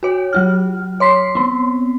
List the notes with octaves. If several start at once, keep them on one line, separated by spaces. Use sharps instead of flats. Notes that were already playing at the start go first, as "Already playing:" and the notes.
F#4 C#5
F#3 F4 F6
C#5 C6 B6 C7
B3 C4